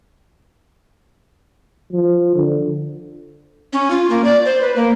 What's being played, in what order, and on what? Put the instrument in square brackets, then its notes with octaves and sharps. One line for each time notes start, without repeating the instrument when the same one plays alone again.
[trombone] F3
D3
[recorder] C#4
F4
A#3
D5
C5
B4
A#3